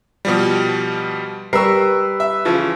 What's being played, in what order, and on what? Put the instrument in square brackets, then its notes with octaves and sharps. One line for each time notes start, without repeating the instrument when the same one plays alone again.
[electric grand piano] B2 F3 G3
[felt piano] G3 B4 [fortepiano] A#4 C#6 [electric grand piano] E6 C7
[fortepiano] E5
C#3 E3 F3